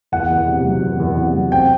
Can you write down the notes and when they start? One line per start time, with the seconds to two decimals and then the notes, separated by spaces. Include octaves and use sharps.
0.12 E2 F#5
0.30 E2
0.48 C3
0.65 F#3
0.82 E2
1.00 E2
1.17 C3
1.34 F#3
1.52 C4 G5